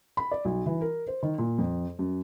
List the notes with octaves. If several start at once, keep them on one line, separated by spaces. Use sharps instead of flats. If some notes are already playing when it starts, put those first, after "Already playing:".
B5
D5
B1
E3
A#4
C5
D#3
A#2
F2
F#2